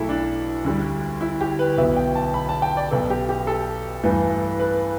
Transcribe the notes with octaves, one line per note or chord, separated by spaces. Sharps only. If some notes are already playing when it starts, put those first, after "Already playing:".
Already playing: B1 B2 A3 E4 A4
D4
D2 D3 G3
E4
G4
B4
B1 B2 B3 E5
G5
A5
B5
A5
G5
D5
B1 B2 B3 A4
G4
G4
A4
G2 E3 A3
B4